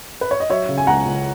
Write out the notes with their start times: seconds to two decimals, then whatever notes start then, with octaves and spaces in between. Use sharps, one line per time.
0.21 B4
0.31 C#5
0.40 D#5
0.50 F#3 C#5 E5
0.69 C#3
0.78 G#5
0.87 C#2 F#5 A#5
1.06 C#2